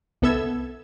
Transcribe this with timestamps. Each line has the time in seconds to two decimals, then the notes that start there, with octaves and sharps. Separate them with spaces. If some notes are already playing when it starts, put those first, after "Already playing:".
0.22 C2 B3 A4 E5 E6 G#6